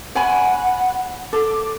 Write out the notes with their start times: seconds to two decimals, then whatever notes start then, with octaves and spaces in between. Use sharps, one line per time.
0.15 C#5 F#5 G#5 B5
1.33 A4 D6